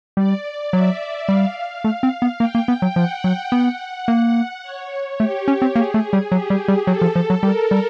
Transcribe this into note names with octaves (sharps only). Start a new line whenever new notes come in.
G3 D5
F#3 E5
G3 F5
A3 F5
C4
B3
A#3 G5
A#3
B3
F#3
F3 F#5
F#3
B3
A#3
C#5
A3 G4
C#4
C4
A#3 G#4
A3
G3
F#3 G4
G3
G3
F#3 A4
F3
F3
F#3
G3 A#4
G3